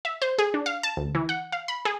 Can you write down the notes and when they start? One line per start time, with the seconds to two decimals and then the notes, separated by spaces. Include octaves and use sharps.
0.05 E5
0.22 C5
0.38 G#4
0.54 D4
0.66 F5
0.83 A5
0.97 D2
1.15 E3
1.29 F#5
1.52 F5
1.68 B5
1.85 G#4